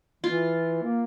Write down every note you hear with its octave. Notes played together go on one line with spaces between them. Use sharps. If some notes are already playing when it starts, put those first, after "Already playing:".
E3 F4
A#3